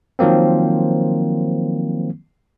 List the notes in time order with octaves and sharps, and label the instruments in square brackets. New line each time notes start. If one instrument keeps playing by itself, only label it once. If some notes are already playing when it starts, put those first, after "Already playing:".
[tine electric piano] D#3 F3 F#3 A#3 C4